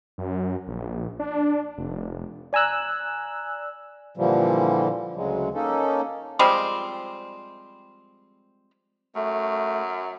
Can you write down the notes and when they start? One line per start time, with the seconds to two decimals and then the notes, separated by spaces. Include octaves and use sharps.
0.18 F#2
0.67 A#1
1.19 D4
1.78 F1
2.53 D5 G#5 A#5 E6 F#6
4.17 A#2 D3 E3 F3 G3
5.16 D2 C#3 F#3 G#3
5.54 A#3 C#4 D#4 A4
6.39 F3 G3 G#3 C4
9.15 F#2 A3